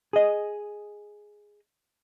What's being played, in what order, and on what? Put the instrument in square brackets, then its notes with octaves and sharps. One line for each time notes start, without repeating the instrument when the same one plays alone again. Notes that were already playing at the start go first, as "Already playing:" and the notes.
[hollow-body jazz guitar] G#4 D#5